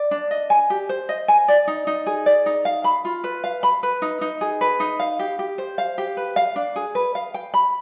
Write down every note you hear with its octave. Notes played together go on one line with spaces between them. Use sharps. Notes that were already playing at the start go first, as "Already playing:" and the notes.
Already playing: D5
D4
D#5
G#5
G4
C5
D#5
G#5
D5
D#4
D#4
G#4
D5
D#4
F5
B5
F4
B4
F5
B5
B4
D#4
D#4
G#4
B4
D#4
F5
G4
G4
C5
F5
G4
B4
F5
D4
G#4
B4
F5
G5
B5